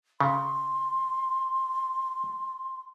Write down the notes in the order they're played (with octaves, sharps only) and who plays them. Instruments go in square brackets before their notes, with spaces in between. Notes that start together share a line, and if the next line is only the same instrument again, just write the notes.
[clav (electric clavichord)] C#3 [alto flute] C6